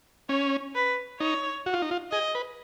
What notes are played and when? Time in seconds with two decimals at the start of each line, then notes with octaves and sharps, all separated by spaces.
0.29 C#4 C#5
0.75 B4
1.20 D#4 C#5
1.66 F#4
1.74 F4
1.82 D#4
1.91 F4
2.11 G#4 D#5
2.35 B4